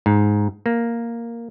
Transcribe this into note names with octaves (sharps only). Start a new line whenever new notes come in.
G#2
A#3